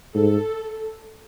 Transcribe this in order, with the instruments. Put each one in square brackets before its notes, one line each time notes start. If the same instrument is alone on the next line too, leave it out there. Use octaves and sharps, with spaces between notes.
[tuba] G#2 [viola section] A4